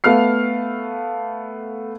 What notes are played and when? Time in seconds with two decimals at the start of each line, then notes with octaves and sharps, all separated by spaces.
0.04 A3 B3 F5 F6 C7